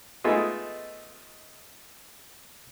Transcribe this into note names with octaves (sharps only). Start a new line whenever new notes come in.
G#3 A3 B3 D#4 F4 G#4